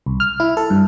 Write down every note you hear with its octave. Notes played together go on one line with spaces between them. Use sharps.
C2
F6
E4
A4
G2